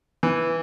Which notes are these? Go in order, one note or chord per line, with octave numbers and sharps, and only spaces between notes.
E3